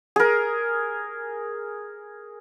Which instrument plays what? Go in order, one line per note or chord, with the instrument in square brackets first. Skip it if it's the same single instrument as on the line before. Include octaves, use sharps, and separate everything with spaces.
[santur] G#4 A#4